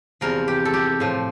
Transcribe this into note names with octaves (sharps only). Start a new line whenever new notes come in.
E2 C3 F3 A#4
G4
A4
G4
A2 F3